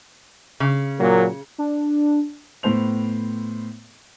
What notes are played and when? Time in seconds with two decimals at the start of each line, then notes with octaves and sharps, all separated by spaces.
0.60 C#3
1.00 A#2 F#3 A#3
1.58 D4
2.63 A2 B3 C5 F7